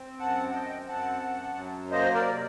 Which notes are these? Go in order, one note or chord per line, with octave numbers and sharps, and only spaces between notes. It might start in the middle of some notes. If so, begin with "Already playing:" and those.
Already playing: C4
F#2 F#5 A5
F#5
C4 D#5 G5
F#2 F#5 A5
F#2
F#3
A#3 C5 D#5
A#4 D5
C3